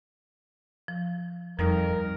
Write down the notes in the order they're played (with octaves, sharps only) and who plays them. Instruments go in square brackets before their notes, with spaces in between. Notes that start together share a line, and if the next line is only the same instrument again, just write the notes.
[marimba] F3
[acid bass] F2 [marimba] F3 G3 D#4 [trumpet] A#4